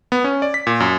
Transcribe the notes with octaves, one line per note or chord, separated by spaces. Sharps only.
B3
C#4
D5
B6
A#2
F#2